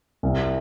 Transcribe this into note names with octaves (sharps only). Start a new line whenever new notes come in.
C2